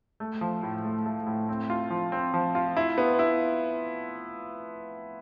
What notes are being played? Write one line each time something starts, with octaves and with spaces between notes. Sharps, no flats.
A3
F3
A2
A3
A3
A2
C4
F4
F3
C4
F3
F4
E4
B3
E4